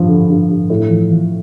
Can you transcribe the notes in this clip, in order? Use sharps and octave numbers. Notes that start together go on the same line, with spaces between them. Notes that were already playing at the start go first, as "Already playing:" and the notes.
Already playing: G2 F3
D3
G2
G2
A2
F3
F3